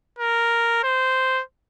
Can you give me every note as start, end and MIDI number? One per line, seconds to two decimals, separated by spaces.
0.19 0.80 70
0.83 1.42 72